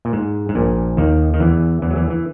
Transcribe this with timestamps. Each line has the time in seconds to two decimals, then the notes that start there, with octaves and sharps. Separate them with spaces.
0.05 A#2
0.13 G#2
0.49 G#2
0.55 A#1 A#2
0.97 D#2 D#3
1.34 D#3
1.40 E2 E3
1.82 E2 E3
1.90 F#3
1.96 E2 E3
2.10 E3